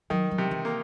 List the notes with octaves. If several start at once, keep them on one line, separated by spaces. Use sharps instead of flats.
D#3 F#3
F#3
C3
E3
A#3